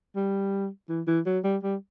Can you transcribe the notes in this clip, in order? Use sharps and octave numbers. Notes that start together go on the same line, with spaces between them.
G3
E3
E3
F#3
G3
G3